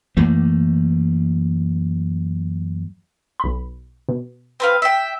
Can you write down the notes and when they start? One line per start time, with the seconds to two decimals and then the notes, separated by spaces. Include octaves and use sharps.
0.17 F#2 E3 A3 A#3
3.40 B1 B5
4.09 B2
4.60 C4 B4 F5
4.82 E5 G5